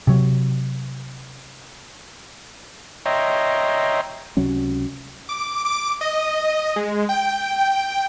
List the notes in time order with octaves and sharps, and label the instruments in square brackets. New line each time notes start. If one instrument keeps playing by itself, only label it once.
[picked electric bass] C3 F#3
[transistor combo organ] C#5 D#5 E5 G5 A#5 C6
[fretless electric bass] C#2 C3 F#3 C#4
[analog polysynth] D6
D6
D#5
G#3
G5